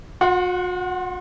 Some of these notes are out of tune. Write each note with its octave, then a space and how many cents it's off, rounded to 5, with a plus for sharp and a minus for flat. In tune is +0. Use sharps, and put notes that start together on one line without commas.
F#4 -45 F#5 +0 C6 +15